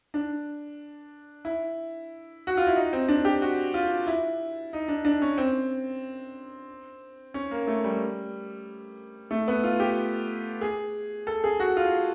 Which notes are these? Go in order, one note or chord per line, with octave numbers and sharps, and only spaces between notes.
D4
E4
F#4
F4
E4
D#4
C4
D4
G4
F#4
F4
E4
D#4
D4
D4
C#4
C4
C#4
A#3
A3
G3
A3
B3
F4
G4
G#4
A4
G#4
F#4
F4